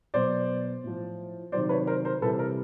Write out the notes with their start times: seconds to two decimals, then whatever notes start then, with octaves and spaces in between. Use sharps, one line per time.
0.14 B2 F#3 C5 D5
0.84 A2 F3
1.52 C3 D#3 F#3 C5 D5
1.69 B4 C#5
1.87 A#4 C5
2.05 A#4 C5
2.21 C3 E3 G3 A4 B4
2.39 A#4